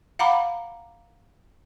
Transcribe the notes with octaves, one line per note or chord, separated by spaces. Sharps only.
F5 F#5 A#5 B5 D6